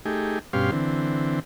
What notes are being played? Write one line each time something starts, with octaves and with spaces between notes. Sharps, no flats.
A3 D#4 G4 G#4
G2 B2 C#4 G4 F5 C6
D3 E3 C4